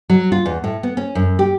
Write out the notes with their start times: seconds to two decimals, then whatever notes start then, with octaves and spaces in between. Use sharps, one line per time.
0.10 F#3
0.32 F4
0.46 E2
0.64 A2
0.83 B3
0.97 C#4
1.15 F#2
1.39 G4